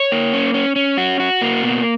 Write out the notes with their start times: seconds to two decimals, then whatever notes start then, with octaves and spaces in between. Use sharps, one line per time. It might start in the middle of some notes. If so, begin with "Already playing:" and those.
Already playing: C#5
0.12 A#3
0.33 C#4
0.54 C#4
0.76 C#4
0.97 F#4
1.20 F#4
1.41 A#3
1.63 B2